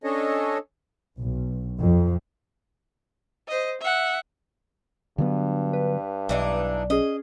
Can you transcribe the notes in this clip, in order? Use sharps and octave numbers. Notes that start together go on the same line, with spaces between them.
C#4 D4 A4 C#5 D#5
B1
F2
C5 D#5
E5 F#5
G2 D3 F#3 B3
B4
B1 E3 D4 D#4
C#4 G#4 D#5